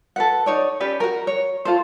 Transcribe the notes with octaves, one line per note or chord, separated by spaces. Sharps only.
A4 B4 F#5
D#4 C#5 D5
C#4 G4 B4 D5
F#4 A#4
C#5
F4 A4 C5